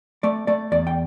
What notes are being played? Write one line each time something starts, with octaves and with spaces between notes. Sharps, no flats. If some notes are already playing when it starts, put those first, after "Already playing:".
A3 D5
A3 D5
E2 D5
G5